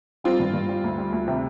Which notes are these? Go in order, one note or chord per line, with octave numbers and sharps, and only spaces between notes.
G3 C4 F4
G2
G2
G3
D2
G3
D2
C3